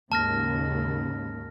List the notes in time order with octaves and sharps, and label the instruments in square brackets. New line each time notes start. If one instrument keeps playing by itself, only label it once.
[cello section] D#2 G#2 C#3 [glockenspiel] A5 F6 A#6